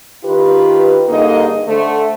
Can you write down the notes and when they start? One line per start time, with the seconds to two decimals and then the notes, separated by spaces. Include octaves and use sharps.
0.24 D#3 F4 G4 B4
1.07 G2 D3 A#3 D#4 G#4 D#5
1.66 D3 A3 C5